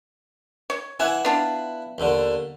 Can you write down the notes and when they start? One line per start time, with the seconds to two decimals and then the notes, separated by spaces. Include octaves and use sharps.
0.70 C#5
1.00 E3 E4 F#5 G#5
1.25 B3 D4 F4
1.98 D#2 D3